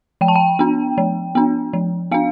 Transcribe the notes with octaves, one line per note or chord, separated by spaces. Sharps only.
F3 G5
A5
G5
B3 D4
F3
B3 D4
F3
B3 D4 F5